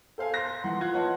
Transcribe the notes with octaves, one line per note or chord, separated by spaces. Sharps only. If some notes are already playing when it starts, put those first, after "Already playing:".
A4 C5 F5 G#5
C6 A#6
E3 F3 F#5 C6
F4 C6 F#6 G#6
B4 C#5 D#5 F#5 A5